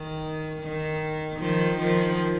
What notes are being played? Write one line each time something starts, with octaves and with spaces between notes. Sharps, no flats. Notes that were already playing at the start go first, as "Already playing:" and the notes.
Already playing: D#3
D#3
D#3 F3
D#3 F3